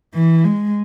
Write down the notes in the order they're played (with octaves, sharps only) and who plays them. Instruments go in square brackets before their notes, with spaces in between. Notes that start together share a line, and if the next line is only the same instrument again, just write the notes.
[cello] E3
G#3